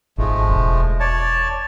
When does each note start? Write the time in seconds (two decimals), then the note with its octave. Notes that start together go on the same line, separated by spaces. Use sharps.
0.18 G#1 F3 G#3 A3
0.49 E1
1.00 C#5 D5 A5